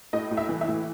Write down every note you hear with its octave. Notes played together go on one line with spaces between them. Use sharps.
A2 D#5
A2
E5
E3
E5
A2